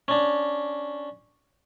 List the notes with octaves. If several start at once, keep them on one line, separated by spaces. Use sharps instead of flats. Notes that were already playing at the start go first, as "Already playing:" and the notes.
C#4 D4